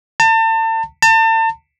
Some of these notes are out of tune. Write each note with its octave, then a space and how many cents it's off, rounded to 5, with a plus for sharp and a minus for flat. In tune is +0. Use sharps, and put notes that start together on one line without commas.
A5 +35
A5 +35